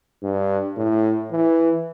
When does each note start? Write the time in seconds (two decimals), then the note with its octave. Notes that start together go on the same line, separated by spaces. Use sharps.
0.23 G2
0.77 A2
1.31 E3